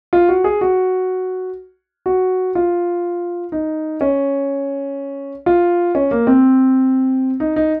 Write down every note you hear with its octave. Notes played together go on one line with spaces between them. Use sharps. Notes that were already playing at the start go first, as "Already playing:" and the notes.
F4
F#4
G#4
F#4
F#4
F4
D#4
C#4
F4
C#4
A#3
C4
D#4
D#4